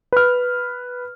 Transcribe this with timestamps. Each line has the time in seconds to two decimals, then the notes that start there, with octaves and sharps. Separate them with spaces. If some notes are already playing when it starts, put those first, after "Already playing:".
0.12 B4 F6